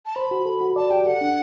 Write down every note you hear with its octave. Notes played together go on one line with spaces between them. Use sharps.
A5
C5 B5
F#4
A4
F#4
D5 A5
G4 G5
A4 F#5
D4